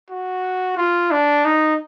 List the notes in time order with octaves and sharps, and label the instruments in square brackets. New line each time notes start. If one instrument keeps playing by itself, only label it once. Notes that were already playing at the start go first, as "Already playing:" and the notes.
[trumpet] F#4
F4
D4
D#4